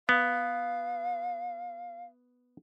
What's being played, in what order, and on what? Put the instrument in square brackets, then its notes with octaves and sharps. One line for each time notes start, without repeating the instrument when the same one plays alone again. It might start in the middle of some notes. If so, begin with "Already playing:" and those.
[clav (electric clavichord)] B3 [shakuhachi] F5